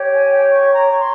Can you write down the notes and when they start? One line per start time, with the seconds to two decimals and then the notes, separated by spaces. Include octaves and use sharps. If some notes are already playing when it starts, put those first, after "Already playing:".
Already playing: G4 C#5
0.12 G#5
0.30 G5
0.50 C#6
0.74 A#5
0.91 C#6
0.98 C6